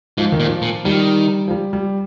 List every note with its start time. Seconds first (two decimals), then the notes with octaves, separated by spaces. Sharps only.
0.18 G#2 F3
0.32 D#3
0.40 A#2
0.46 F3
0.62 A#2
0.85 D#3 G3
1.48 F3
1.51 G3
1.73 G3